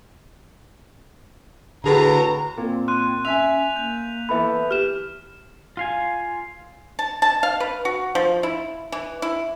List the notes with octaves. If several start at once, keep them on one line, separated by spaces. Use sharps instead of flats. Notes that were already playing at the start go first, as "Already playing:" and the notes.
A2 D3 F#4 G#4 B4 A#5
A#2 C4
C6 F6 F#6 D#7
C#4 E5 G#5 B6 F7
A#3 G6 F7
E3 B3 A4 E5 B5
G4 F6 E7
F4 F5 G#5
A5
A5
F5
B4
F#4
F3
E4
E3
E4